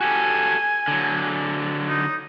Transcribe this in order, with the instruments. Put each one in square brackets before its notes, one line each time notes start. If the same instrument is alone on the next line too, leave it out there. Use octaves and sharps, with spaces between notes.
[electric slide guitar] F#4 G4 A4 [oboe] G#5
[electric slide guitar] D3 F#3
[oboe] D#4